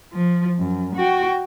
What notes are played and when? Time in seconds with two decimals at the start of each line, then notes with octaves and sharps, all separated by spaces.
0.13 F3
0.59 F#2
0.96 F#4 G5